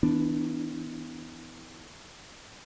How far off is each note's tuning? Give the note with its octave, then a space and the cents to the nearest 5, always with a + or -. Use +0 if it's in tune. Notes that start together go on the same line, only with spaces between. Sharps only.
E3 -35 B3 +20 D4 +0